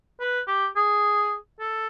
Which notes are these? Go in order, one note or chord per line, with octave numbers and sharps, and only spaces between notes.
B4
G4
G#4
A4